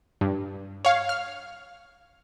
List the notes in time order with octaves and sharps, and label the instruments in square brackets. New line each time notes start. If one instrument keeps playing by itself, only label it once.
[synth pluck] G2
C#5 F5
F6